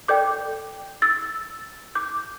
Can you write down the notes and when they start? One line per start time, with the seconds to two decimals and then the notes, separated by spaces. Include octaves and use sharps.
0.08 A4 D5 G5 D6 G6
1.02 E6 A6
1.95 D6 G6